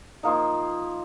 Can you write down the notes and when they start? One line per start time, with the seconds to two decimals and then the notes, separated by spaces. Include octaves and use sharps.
0.23 F3 A#3 D#4